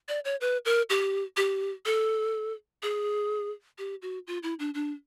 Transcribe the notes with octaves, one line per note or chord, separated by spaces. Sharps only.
D5
C#5
B4
A#4
G4
G4
A4
G#4
G4
F#4
F4
E4
D4
D4